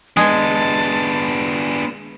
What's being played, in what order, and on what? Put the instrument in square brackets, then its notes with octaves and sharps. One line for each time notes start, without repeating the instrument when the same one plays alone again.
[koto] G#3 [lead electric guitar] B3 D4 [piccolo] A5